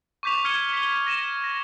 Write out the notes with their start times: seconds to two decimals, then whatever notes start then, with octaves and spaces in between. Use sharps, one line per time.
0.23 C#6 D6 G6 B6 F7
0.45 F6 G#6 C#7 D#7 G7
0.73 B6 G7
1.07 A#6 D#7 E7
1.44 A#6